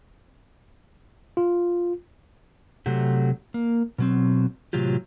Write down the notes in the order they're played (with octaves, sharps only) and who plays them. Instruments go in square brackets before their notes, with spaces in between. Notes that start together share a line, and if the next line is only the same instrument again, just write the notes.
[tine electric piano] F4
[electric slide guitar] C3 F#3 A3 F#4 G4
A#3
B2 F#3 C4
A2 C3 E3 F#3 F4 G4